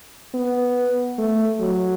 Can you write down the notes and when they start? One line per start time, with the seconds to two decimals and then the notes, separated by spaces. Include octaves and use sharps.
0.34 B3
1.18 A3
1.60 F#3